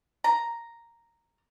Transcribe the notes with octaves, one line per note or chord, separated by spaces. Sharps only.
A#5